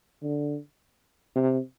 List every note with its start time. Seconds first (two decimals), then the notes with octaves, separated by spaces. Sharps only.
0.23 D3
1.36 C3